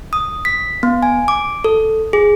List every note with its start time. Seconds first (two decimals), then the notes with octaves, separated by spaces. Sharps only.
0.13 D#6
0.45 B6
0.83 B3
1.03 G#5
1.28 D6
1.64 A4
2.13 G#4